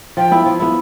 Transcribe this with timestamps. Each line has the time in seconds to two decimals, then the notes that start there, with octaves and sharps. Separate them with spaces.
0.17 F3 G5
0.31 B3 E4
0.46 F3
0.60 B3 E4